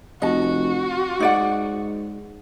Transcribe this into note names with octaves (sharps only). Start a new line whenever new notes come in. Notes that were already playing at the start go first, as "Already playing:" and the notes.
F1 F#4 D#5 A5
G#2 D#4 D5 F#5